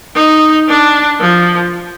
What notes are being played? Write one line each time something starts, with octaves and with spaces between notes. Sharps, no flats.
D#4
D4
F3